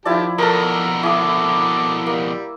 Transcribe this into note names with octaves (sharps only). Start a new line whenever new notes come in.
D#3 F3 E4 G4 D5 A5
F2 B2 A4 A#4 A#5
E4 A4 D6 D#6
G3 A#3